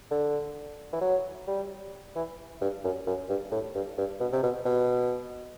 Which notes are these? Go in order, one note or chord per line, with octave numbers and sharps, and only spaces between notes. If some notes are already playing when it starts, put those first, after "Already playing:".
D3
E3
F#3
G3
E3
G2
F#2
F#2
G2
A2
G2
G2
B2
C3
B2
B2